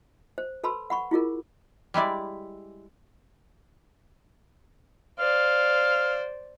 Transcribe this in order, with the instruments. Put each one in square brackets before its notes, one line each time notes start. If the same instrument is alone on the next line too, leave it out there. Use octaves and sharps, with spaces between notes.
[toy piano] C5
A4 B4 A5 B5 C6 E6
F#5 B5 C#6
E4 F4 G#4 A#4
[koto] G3 G#3 E4 D5
[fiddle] C5 D5 [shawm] F5